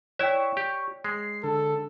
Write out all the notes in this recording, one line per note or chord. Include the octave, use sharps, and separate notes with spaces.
E4 C#5 D5 E5 G5 C#6
G4
G#3 C7
D3 A4